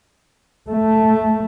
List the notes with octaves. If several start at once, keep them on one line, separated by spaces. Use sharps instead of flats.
A3